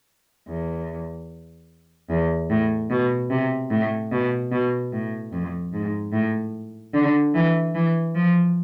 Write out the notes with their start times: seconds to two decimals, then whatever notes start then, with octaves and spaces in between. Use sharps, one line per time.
0.49 E2
2.10 E2
2.50 A2
2.91 B2
3.31 C3
3.71 A2
4.12 B2
4.52 B2
4.93 A2
5.33 F2
5.73 G#2
6.13 A2
6.94 D3
7.35 E3
7.75 E3
8.15 F3